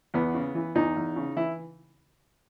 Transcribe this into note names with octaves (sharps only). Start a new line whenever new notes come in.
E2 B3
C#3
E3
E2 D#4
E2
C#3
E3 E4